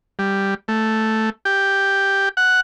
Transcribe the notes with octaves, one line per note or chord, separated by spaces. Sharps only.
G3
A3
G4
F#5